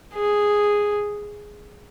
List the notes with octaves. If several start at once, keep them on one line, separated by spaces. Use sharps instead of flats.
G#4